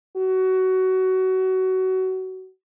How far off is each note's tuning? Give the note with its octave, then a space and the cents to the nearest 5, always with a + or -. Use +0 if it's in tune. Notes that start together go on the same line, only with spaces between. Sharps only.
F#4 +20